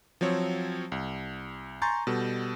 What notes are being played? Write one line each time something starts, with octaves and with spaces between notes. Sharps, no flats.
F3 F#3 C4 C#5
C2
G#5 A#5 C6 C#6 G6 A6
B2 G3 A4